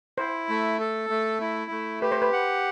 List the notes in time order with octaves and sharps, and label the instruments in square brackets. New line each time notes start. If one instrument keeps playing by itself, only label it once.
[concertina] E4 [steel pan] C5
[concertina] A3
A4
A3
E4
A3
[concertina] G4 [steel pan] B4
[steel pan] C5
B4
[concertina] F#5